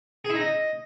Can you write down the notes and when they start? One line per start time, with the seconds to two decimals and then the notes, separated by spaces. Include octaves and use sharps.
0.25 G#4
0.30 E4
0.35 D#4
0.40 D#5